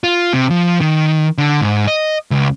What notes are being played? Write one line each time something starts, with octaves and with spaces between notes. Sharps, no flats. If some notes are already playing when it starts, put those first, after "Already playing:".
F4
C3
F3
D#3
D3
G#2
D#5
C#2